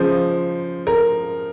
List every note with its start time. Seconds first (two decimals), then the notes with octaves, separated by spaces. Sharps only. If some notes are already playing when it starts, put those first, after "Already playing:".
Already playing: C#3 F3 G#3 C5
0.87 A#4